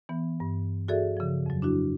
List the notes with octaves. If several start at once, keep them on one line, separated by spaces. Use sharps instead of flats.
E3 B3
G2
F#4 G#4 A4 D5 E5
C#3 F3
F2 F#3
D4 E4 F#4